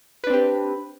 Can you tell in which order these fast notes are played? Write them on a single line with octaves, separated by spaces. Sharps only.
B4 D4 C4 G4